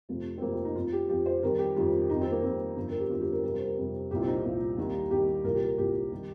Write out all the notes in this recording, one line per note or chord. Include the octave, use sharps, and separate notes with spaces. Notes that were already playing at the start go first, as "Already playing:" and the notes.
F1 F2 C3 F3
C4
F1 F2 C3 F3 A#3
C4
D#4
F2 F3 F4
G4
F2 F3 G4
C5
F2 D#3 G3 A#4
G4
F2 D#3 G3 F4
F2 D#3 G3 D#4
C4
A#3
F2 D#3 G3 C4
G1 F2 F3
A#4
G4
G1 F2 F3 F4
G4
A#4
F2 C3 G3 A#4
C5
A#4
F2 C3 G3
C2 A#2 F3 G4
C4
D#4
C2 A#2 F3
D#2 D#3 G3
D#2 D#3 G3 G4
C2 A#2 F3 A#4
G4
A#4
C2 A#2 F3 G4
D#3 G3